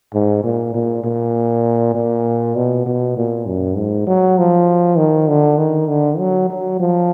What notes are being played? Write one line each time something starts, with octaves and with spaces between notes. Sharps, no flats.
G#2
A#2
A#2
A#2
A#2
B2
B2
A#2
F#2
G#2
F#3
F3
D#3
D3
D#3
D3
F#3
F#3
F3